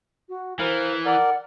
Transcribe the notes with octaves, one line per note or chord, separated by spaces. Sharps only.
F#4
E3 A#4 C5 F5
A#4 D5 F#5